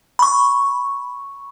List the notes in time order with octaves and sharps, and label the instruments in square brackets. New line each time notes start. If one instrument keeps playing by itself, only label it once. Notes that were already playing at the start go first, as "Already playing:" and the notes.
[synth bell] B5 C#6